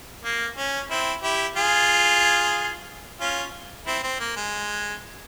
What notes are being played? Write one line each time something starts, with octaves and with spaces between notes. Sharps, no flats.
A#3
C#4
C4 E4
E4 G4
F4 G#4
C#4 F4
C4 E4
C4
A#3
G#3